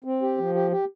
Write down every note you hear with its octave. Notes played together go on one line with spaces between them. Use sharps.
C4
G4
F3
G4
G4